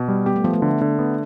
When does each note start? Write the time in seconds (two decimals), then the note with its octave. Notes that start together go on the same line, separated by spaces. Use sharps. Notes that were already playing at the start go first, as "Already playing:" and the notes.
Already playing: B2
0.08 G3
0.26 B3 G4
0.36 A3
0.44 F3 B3
0.53 A3
0.62 D3
0.81 D3
0.99 B3